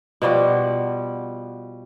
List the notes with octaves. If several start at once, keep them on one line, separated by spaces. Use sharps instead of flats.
B2 F3 G3 F#4